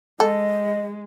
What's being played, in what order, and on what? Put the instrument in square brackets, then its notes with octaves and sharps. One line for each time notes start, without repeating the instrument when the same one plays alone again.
[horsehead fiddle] G#3 [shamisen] A4 [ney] D#5